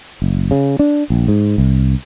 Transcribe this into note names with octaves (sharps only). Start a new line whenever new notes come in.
F#1
C#3
D4
A#1
G#2
C2